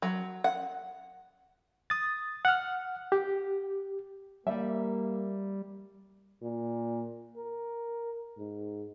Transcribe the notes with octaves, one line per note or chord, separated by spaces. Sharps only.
F#3
F#5
D#6 A6
F#5 F6
G4
G3 A#3 E5
A#2
A#4
G#2